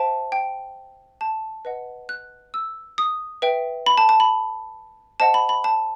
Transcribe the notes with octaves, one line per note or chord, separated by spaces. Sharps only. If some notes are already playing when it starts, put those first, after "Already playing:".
Already playing: C5 E5 G5 A5
G5
A5
B4 D#5 F#5
F#6
E6
D#6
B4 E5 G5
B5
A5
A5
B5
C5 D#5 F#5 A5
B5
B5
A5